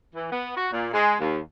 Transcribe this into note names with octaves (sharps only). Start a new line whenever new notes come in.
E3
B3
F#4
A#2
G#3
D#2